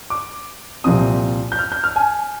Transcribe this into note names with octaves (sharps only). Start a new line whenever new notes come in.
D6
C2 A#2 F3 C4 D#6
G6
F6
G6
F6
G#5